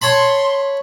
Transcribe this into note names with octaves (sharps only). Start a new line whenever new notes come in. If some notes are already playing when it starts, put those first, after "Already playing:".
C#5 A5 B5 C6